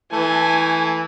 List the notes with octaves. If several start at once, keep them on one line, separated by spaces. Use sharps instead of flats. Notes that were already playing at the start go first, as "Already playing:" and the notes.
E3 A3 G#5